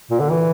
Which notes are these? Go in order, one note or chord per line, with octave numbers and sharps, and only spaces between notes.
A#2
D3
E3